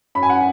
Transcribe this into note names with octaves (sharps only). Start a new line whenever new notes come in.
F#2 B5
G#5
F#5